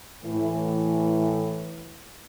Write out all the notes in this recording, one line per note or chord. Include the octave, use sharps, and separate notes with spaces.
A2 E3